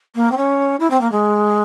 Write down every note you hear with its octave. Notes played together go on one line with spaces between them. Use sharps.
A#3
C4
C#4
E4
C4
A#3
G#3